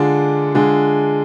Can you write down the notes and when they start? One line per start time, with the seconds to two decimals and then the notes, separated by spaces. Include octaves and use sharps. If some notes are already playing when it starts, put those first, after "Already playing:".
Already playing: D3 G#3 D4 F4 G#4
0.55 D3 G#3 D4 F4 G#4